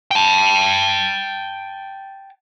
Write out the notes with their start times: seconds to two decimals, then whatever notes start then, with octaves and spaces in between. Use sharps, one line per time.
0.11 G5 A5